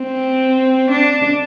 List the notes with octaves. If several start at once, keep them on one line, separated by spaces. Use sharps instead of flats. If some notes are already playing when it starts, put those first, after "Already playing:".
Already playing: C4
D4